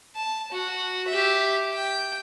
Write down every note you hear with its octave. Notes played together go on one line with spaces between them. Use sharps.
A5
F#4
G4 E5
G5